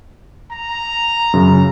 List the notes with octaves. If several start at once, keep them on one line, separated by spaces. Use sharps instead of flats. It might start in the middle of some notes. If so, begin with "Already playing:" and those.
A#5
F#2 C#3